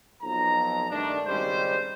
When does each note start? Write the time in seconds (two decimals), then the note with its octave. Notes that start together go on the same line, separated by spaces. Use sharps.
0.22 B1 F2 A#5
0.90 G2 D#3 A3 D4
1.26 G#1 C#3 G3 G#3 D#4 C5